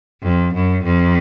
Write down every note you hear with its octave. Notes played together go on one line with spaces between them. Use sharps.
F2
F#2
F2